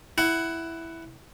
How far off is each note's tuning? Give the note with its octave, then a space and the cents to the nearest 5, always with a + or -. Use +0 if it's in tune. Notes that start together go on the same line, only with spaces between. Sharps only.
E4 +0 F#5 +15